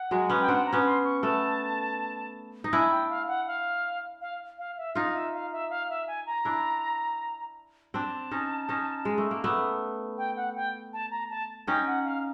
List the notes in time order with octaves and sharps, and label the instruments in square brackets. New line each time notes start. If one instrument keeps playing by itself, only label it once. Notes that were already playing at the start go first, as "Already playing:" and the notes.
Already playing: [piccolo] F#5
[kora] F#3 G#3
B3 C#4
[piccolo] G5
[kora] C4 D4 [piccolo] F#5
[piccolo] A#5
[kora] B3 C#4
[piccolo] C6
C#6
[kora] A3 B3 [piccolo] A5
[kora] D#4
[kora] D4 E4 [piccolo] G#5
[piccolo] G5
F5
F#5
F5
F5
F5
E5
[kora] D#4 F4 [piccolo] F5
[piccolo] E5
F5
E5
F5
E5
G#5
A#5
[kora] D4 E4
[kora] C4 D4 [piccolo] A5
[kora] C#4 D#4
C#4 D#4
G#3
A3
A#3
A3 B3
[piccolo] G5
F#5
G5
A5
A#5
A5
[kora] C#4 D#4 [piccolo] G5
[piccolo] F#5
F5